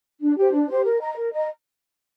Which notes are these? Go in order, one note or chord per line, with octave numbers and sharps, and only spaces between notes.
D4
G4 C5
D4
G4 C5
A#4
D#5 A#5
A#4
D#5 A#5